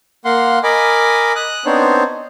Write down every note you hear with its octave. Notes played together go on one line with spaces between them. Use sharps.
A#3 F5 F#5 C6
A#4 D#5 G#5 B5 D6
D#6 F#6
B3 C4 D4 D#4 C5 C#5